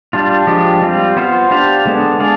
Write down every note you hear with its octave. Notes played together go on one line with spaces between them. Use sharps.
G3 D4 F4
F3 G#3 D4 G4
G3 C4 F4
B3 F4 C5 F5
D4 G4 C5 F5
D3 G#3 B3 D4
D4 G#4 D5 F5